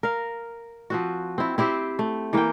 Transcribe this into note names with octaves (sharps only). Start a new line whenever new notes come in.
A#4 F5
F3 C4 F#4
C4 E4
C4 E4 G4 C5
A3
E3 A#3 A#4 G5